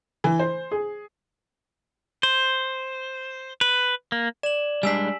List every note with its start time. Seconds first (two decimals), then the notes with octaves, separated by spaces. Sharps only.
0.24 E3
0.39 C5
0.71 G#4
2.23 C5
3.61 B4
4.12 A#3
4.43 D5 E7 F#7
4.83 G3 G#3 D4 G#5 E6 B6